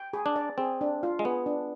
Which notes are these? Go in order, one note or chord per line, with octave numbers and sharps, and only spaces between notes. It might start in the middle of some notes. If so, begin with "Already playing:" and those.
Already playing: G5
G#4
D4
D5
C4 G#4
D4
F4
G#3
B3 G#4
D4